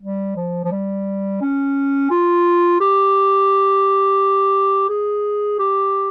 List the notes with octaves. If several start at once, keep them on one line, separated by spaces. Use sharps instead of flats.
G3
F3
F3
G3
C#4
F4
G4
G#4
G4